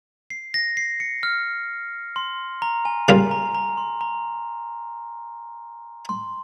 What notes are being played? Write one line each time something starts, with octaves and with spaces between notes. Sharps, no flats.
C7
A#6
C7
C#7
F6
C6
A#5
G#5
C#3 G3 A#3 F4 G#5
A#5
A#5
C6
A#5
C6